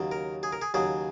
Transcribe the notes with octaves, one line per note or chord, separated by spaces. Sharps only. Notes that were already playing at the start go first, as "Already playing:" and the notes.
Already playing: D#2 C#3 F#3
A#4
G#4
A#4
G#4
D#2 C#3 F#3 G#4